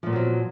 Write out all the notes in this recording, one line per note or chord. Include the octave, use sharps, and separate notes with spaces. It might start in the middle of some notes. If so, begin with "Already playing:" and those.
A#2 F3 F#3 B3 C4